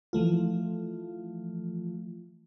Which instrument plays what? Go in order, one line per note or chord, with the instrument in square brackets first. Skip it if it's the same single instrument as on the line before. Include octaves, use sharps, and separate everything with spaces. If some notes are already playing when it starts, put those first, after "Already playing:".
[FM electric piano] E3 F3 A3 F4